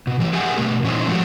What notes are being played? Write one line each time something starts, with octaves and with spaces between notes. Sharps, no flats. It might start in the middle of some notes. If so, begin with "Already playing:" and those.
B2
E3 G4
G4 G#4 A#4 E5 F#5 G#5
B2 D#3 A3 G4
A#2 E3 C#4 D#4 C5
F3 F#3 G#3 A3 F#4 G4